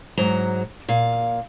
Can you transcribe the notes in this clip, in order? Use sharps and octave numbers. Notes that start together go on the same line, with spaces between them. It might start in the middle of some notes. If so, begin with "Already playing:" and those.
G#2 F#3 A#5
A#2 F5